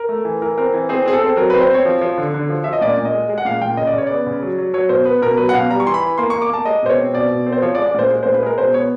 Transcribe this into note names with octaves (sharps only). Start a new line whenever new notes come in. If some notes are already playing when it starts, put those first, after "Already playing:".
Already playing: A#4
A3
E3
E3 A#4
C4 A#4
E3
C4 G#4
C4 G#4
A4
C4
F#3 A#4
C4 B4
C5
C4 C#5
F3
F3
D3
D3
F3
F3 E5
D#5
A#2 D5
A#2
D#5
G#3
G#3
F#5
A#2 F5
A#2 G5
C#3 D#5
D5
C#3 C#5
B3 D5
C#3
F#3
F#3
F#3 C#5
B2 C5
B3 B4
B2 A#4
F#3 B4
F#5
B2 F5
G3 A#5
C#6
E3 C6
B5
E3
A#3 C6
A#3 C#6
D6
A#3 A5
G#3 D#5
B2 C5
C#5
C4
B2 D5
B2
C4
C5
F3 C#5
D5
G#3
D5
A#2 C5
G#3
A#2 C5
B4
G#3 A#4
B2 C5
B3 C#5